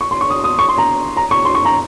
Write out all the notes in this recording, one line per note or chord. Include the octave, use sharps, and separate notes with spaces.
C#6
C6
C#6
D#6
D#6
C#6
C6
A#5
A#5
C#6
C6
C#6
A#5